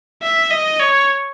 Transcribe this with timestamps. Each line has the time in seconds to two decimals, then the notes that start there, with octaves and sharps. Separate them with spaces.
0.22 E5
0.51 D#5
0.80 C#5